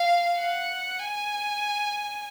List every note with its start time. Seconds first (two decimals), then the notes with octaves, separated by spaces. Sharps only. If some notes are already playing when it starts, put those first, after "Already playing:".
Already playing: F5
0.40 F#5
0.99 G#5